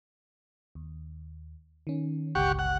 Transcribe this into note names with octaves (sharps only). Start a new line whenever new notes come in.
D#2
D#3 C#4
G1 C#2 G4 F#5 C#6
F#5